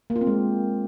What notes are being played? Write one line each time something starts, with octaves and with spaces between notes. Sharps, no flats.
A#3
F4
C4
G#3